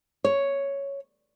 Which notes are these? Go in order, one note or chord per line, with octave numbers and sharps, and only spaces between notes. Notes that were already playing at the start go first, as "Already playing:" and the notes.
C#5